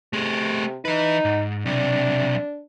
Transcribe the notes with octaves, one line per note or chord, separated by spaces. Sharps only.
C3 A3 G#4
E3 D#4 B4
G#2
B1 C3 D4